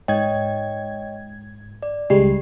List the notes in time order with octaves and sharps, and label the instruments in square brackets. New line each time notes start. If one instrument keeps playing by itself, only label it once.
[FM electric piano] G#2 G#6 [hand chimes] C#5 D#5 G5
[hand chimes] D5
[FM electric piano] C#2 G3 G#3 [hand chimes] G4 C7